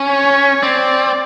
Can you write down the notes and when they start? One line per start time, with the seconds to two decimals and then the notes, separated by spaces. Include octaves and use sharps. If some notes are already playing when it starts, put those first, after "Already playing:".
Already playing: C#4
0.10 C#5
0.62 C4 D5